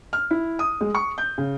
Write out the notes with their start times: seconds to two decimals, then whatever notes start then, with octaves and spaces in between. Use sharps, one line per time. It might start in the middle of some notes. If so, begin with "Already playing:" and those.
0.13 F6
0.31 E4
0.59 D#6
0.81 G#3
0.95 C#6
1.18 G6
1.38 C#3